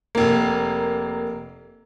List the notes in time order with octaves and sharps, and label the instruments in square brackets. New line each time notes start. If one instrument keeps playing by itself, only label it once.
[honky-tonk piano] F1 A#3